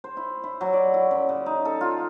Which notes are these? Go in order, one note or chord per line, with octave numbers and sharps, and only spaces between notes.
C5
E4
E4
F#3
D5
E4
F#2
C#3
D#4
A4
F4